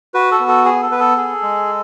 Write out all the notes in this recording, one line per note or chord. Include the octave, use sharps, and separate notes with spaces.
F#4 B4
A4
B3
A4
G#4
A4
B3 B4
A4
G#4
G#3